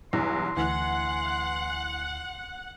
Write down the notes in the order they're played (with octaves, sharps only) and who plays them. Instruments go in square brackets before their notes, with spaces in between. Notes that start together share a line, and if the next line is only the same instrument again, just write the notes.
[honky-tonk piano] B1 E2 G2 [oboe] C6
[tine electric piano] D2 [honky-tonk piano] E3 [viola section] F#5